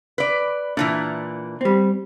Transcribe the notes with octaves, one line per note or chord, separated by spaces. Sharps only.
B4 D5
A#2 D#3 E3 D4
G3 C4